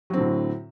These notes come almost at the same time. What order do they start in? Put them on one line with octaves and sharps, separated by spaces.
F#3 C4 D3 A2